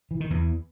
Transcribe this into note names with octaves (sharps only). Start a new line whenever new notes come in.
E3
D#3
E2 E3